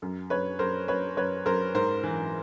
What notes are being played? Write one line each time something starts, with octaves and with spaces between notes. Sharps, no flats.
F#2
F#2 B4 C#5
F#2 A#4 C5
F#2 B4 C#5
F#2 B4 C#5
F#2 A#4 C5
G#2 A#4 C5
E3